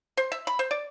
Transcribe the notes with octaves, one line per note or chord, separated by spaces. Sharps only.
C5
E5
B5
C5
D5